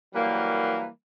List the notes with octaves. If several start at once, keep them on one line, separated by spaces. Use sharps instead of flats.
E3 F#3 G3 A#3